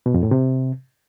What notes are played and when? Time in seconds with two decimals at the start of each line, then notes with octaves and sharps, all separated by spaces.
0.06 B2
0.14 F2
0.23 A2
0.31 C3